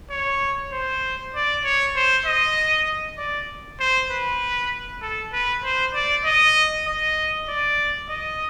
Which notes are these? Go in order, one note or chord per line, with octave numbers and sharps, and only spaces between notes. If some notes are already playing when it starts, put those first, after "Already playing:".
C#5
C5
D5
C#5
C5
D#5
D5
C5
B4
A4
B4
C5
D5
D#5
D#5
D5
D#5